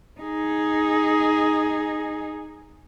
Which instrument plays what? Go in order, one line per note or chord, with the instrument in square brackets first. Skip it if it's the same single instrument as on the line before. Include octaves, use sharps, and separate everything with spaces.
[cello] D#4 G#4